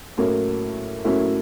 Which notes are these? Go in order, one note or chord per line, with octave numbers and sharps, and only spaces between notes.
A2 F#3 A#3 C#4
A2 F#3 A#3 C#4 E4